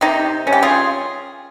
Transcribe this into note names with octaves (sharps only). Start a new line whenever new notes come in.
C3 D#4 G4
G3 C#4
G4
F4 G#4